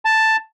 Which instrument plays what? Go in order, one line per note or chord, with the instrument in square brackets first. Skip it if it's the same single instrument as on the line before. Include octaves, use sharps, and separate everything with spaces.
[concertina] A5